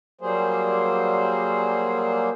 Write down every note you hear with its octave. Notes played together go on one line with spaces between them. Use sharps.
F#3 G3 A#3 G#4 C5